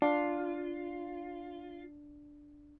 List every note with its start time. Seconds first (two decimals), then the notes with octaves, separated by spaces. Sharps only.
0.02 D4 F4